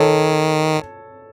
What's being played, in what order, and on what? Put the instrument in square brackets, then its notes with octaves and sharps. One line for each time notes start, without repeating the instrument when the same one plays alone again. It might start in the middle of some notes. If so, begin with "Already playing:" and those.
Already playing: [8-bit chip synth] D#3 [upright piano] A4 C#5